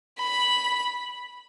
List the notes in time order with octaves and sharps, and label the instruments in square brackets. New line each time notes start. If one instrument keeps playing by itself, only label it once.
[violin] B5